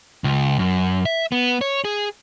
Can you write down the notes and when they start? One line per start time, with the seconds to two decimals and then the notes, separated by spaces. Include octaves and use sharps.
0.24 C#2
0.59 F#2
1.05 E5
1.32 B3
1.61 C#5
1.85 G#4